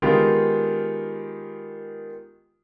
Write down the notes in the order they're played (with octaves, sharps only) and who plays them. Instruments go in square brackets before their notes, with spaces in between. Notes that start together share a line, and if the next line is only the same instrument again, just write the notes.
[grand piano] D#3 G#3 B3 D#4 F4 G4